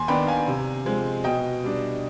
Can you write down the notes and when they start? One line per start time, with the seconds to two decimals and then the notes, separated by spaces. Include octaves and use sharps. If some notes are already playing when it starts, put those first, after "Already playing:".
Already playing: D#2 G#5 C6
0.08 D#3 B3 D4 G5 B5
0.27 F5 G#5
0.47 C3
0.85 F3 G#3 C4
1.24 B2 D#5 G5
1.64 G3 D4